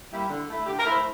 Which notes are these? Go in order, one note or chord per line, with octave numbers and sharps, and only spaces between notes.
G3 A#3 E4
D3
A3 E4
D3 G4
A#4
A3 E4
C5